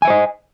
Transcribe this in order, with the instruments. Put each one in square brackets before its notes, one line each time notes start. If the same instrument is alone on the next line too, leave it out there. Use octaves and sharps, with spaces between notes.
[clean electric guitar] G#5
E5
C5
D#5